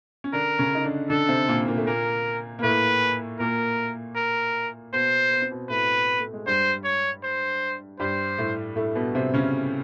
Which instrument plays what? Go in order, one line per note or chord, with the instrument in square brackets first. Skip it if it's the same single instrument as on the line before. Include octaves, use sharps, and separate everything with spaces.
[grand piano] C#4
[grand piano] D3 D4 [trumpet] A#4
[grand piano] C#3 C#4
D#4
D3 D4
[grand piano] D3 D4 [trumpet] A4
[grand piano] C3 C4
A#2 A#3
A#2 A#3
A3
[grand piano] A#2 A#3 [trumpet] A#4
[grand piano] A#3
[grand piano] A2 A3 [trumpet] B4
[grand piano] A#2 A#3 [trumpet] A#4
[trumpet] A#4
[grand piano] B2 B3 [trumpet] C5
[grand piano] B3
C4
B2 B3
[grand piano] A2 A3 [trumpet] B4
[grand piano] A3
G#3
[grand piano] G2 G3 [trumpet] C5
[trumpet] C#5
C5
[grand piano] G2 G3 [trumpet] C5
[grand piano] A2 A3
A2 A3
B2 B3
C3 C4
C#3 C#4